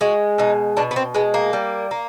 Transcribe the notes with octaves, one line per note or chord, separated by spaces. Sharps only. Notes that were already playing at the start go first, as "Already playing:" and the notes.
G#3 F#4
B2 D#4
B2 D4
B3
C4
G#3 B3
A#3
G3
A#3